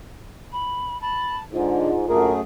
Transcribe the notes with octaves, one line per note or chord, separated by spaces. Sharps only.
B5
A5 B5
G#2 D3 F4
F#2 D3 A3 A#3 G#4 A#4